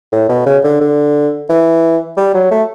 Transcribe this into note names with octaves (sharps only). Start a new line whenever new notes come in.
A2
B2
C#3
D3
D3
E3
G3
F#3
A3